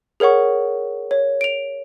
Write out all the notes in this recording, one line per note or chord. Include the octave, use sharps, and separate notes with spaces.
G#4 A#4 C#5 F#5 C#6
C#5
D7 F7